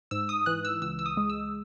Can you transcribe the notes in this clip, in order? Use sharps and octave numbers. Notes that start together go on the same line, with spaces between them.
G#2 E6
D#6
E3 F#6
E6
C#2 E6
E6
D#6
G#3
E6